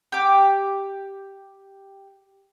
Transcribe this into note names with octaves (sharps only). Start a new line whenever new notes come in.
G4 D6